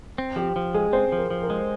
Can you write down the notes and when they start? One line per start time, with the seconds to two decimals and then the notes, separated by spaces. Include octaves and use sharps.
0.18 C4
0.36 F3 G4
0.56 F3
0.74 G#3 G#4
0.93 C4 C5
1.12 F3
1.18 A#4
1.30 F3
1.43 A#4
1.50 G#3